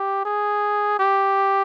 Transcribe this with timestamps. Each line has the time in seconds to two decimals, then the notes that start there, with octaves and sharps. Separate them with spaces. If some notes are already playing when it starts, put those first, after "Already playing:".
Already playing: G4
0.25 G#4
0.99 G4